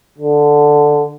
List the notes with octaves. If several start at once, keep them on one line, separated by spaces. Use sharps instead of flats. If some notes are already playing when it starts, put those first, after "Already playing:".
D3